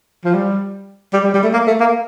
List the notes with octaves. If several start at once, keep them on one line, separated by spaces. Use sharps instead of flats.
F3
G3
G3
G3
G3
A3
A#3
A3
A#3